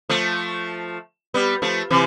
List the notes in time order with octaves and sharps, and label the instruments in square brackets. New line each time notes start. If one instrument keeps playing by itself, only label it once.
[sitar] F3 A3
G3 B3
F3 A3
C3 E3